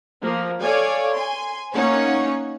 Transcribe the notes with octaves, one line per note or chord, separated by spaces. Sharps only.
F3 A#3
A4 C#5 D5 F5 G#5
G#5 C6
A#3 C#4 D#4 C#5 F#5